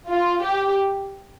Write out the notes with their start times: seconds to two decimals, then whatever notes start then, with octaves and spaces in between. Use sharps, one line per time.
0.10 F4
0.42 G4